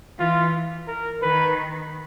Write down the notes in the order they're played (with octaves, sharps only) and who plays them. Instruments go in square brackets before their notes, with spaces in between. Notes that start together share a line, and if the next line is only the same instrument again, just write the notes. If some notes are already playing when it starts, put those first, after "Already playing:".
[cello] E3 [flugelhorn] F4
[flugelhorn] A#4
[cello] D#3 [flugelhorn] B4